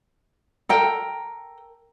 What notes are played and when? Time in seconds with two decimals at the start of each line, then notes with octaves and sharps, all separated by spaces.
0.69 A4 A#4 G5